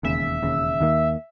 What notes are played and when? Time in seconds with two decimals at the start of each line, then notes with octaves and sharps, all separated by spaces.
0.03 E1 D#2 C#3 E5
0.42 E1 D#2 C#3
0.80 D#2 D#3 A#3